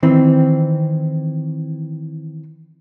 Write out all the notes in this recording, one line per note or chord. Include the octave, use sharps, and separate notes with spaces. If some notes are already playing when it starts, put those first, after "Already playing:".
D#3 E3 C4